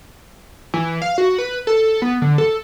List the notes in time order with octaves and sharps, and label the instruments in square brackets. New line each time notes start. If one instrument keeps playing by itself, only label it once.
[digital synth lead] E3
F5
F#4
B4
A4
B3
D3
A4